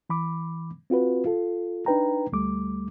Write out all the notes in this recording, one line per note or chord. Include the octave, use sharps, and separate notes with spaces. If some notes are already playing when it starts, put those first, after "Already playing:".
E3 B5 D6
C4 F4 F#4 B4
F4 A4
D4 D#4 B4 G5 A#5
D2 G3 A3 D6